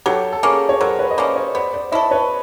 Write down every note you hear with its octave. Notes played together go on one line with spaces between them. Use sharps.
F#3 G4 A4
A4
A#3 C#4 G#4 A#4
C#5
F#3 A#4 C5
B4 C#5
D#5
A#3 C#4 C5 D5
C#5 D#5
B3 C5 D5
C5 D5
E4 A4 C#5 D#5
B4 C#5